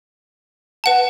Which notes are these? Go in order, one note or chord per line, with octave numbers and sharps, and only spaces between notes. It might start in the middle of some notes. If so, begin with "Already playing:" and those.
B4 F#5 A5